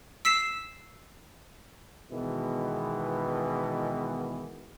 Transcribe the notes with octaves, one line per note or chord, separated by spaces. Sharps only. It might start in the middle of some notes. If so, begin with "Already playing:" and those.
E6 B6 C7 E7
B2 D#3 E3 G#3 B3